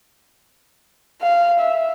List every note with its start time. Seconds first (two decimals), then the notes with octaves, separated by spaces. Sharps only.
1.22 F5
1.60 E5